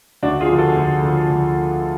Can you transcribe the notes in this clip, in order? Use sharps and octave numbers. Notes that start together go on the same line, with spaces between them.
D2 D4 F#4
F4 G#4
D3 F3
F#4 A4
D2
D3 F3
D2